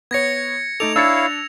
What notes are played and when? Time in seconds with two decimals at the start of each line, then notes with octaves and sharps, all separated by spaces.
0.11 B3 C#5 G#6 A#6 C#7
0.80 A3 D#4 A4 D6 F7
0.96 D4 E4 C#5 F5 E6 A6 C#7